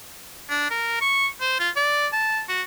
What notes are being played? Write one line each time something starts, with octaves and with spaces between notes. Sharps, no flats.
D4
A#4
C#6
C5
F4
D5
A5
F#4